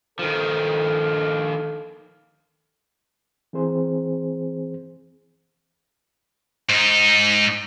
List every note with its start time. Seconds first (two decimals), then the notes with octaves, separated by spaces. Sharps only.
0.19 D#3 F3 A4
3.53 E3 C4 G#4 C5
6.69 G#2 D#4